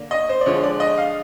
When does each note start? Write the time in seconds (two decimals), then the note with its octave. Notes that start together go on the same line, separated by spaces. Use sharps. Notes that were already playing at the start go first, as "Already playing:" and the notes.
Already playing: D3 A#3 D4
0.11 D#5
0.29 C5
0.41 D5
0.46 D3 F3 G#3 C#5
0.64 D5
0.80 D#5
0.98 F5